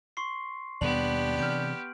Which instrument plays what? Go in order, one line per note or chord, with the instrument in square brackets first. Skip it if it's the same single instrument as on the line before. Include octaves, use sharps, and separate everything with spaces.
[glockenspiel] C6 C#6 C7
[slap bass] D#2 B2 G3 [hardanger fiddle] B3 G4 [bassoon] D4 [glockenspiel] F#7
[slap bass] C3 E3 C4 [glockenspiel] F6 G6 D7